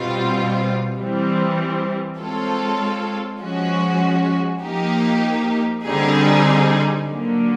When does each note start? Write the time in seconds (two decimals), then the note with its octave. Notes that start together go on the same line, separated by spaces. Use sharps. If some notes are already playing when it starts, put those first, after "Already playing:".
Already playing: B2 G3 C4 F4
0.97 E3 G3 C4
2.18 G#3 C4 F4 A4 C#5
3.40 F3 G#3 C#4 F#4
4.61 F3 A#3 D#4 G4
5.84 D3 G3 C4 D#4 G#4
7.06 D3 F#3 A#3